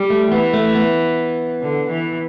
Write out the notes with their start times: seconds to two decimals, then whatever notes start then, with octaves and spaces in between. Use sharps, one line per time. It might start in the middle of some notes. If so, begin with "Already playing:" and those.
Already playing: G3
0.10 A3
0.32 E3 B3
0.54 A3
0.75 B3
1.61 D3
1.90 E3